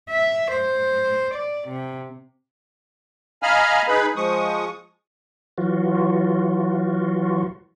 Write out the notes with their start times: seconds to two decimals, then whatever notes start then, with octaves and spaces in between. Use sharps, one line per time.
0.10 E5
0.51 C5
1.34 D5
1.68 C3
3.43 D#5 F5 G#5 A#5 B5 F6
3.88 D#4 G#4 B4 B5
4.16 F3 G#3 C#6 D#6
5.58 E3 F#3 F4 F#4